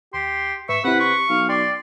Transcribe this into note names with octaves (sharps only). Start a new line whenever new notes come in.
D#2 G4 C6
G#2 B4 E5 C#6
C3 C4 E4 B4 F#5
C6 C#6
B1 F5
D5 G5 C6 D6